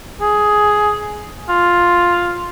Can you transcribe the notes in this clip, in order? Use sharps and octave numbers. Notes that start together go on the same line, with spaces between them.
G#4
F4